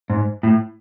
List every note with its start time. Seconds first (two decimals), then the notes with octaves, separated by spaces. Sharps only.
0.10 G#2
0.43 A2